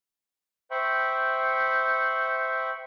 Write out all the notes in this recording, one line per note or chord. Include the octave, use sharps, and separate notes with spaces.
C5 E5 G5 B5 C#6